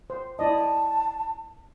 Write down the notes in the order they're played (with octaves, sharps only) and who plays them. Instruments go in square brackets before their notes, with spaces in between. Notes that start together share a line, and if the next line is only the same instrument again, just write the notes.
[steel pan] C5
[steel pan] E4 D5 D#5 [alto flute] A5